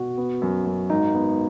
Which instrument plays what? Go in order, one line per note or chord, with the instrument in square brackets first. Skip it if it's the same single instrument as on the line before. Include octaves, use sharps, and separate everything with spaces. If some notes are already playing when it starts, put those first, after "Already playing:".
Already playing: [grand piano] B2 [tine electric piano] F#4
[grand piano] B3
F#2
F#2
[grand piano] G#1 [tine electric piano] D#4
[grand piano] B3